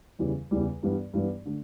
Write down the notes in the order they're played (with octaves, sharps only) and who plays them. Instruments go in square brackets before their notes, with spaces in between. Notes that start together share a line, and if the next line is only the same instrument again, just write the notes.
[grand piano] E2 C#3 E3 G3
E2 C#3 E3 G3
G2 E3 G3 B3
G2 E3 G3 B3
D3 A3